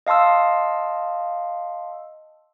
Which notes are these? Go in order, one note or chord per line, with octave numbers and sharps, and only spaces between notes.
D#5 F5 A5 C6 E6